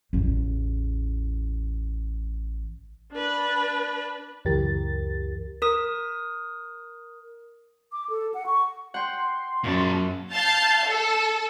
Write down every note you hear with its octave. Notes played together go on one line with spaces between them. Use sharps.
A1 E2
D4 B4
C#2 F#2 E3 G4 A#4 A6
A#4 D#6
D6
A4
F#5
C#6
F#5 G5 C6
F#2 A#2 A5
F5 A5 G6 A6
A4